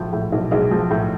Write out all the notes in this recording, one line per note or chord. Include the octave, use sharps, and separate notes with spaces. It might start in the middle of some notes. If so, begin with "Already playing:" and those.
Already playing: B1 A2 F3
A2
B1
B1 G#3
F3
A2